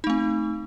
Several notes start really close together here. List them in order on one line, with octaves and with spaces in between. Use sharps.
D#4 A3 C4